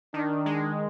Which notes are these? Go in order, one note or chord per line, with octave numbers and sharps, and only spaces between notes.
D#3 D4
G#3